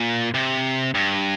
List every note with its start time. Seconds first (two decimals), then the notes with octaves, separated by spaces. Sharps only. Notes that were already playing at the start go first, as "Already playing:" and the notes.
Already playing: A#2
0.34 C3
0.95 G2